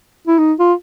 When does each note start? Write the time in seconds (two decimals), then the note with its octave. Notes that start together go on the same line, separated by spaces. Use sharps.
0.27 E4
0.39 D#4
0.59 F4